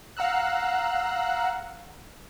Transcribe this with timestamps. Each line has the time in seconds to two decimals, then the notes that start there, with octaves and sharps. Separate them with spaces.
0.17 F5 F#5 A#5 E6 F#6